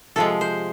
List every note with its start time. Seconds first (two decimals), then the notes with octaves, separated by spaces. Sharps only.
0.16 C3 F3 G#3 A4
0.41 C5